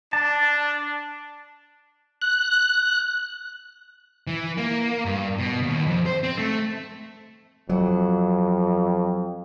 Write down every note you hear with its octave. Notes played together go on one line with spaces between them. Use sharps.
D4 A5
F#6
E3
A#3
G2
B2
D#2
F2
C5
C4
A3
F2 F#3